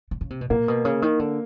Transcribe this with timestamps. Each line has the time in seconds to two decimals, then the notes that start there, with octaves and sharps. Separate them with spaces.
0.11 D3
0.21 C#3
0.30 C3
0.41 B2
0.50 A#2 A#3
0.68 B2
0.85 C#3
1.02 D#3
1.19 D3